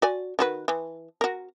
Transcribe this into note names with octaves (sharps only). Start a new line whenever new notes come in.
F#4 D5 G#5
D#3 F#4 B4
E3
F#4 A#4